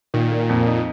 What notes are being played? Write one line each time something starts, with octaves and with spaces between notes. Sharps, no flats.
A#2 D#3
A#3
F2
D#4